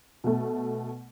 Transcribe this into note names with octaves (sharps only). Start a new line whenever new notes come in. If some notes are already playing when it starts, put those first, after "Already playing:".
B2 A3